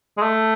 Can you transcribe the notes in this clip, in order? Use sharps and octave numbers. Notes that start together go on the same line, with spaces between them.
G#3
A3